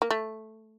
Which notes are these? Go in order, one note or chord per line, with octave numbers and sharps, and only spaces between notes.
A#3
A3